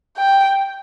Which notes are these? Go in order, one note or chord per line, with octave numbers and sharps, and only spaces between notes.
G5